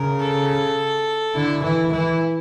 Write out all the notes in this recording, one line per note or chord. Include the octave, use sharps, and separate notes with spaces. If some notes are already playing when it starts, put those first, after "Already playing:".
Already playing: C#3 A#4
A4
D3 E4
E3 E4
E3 E4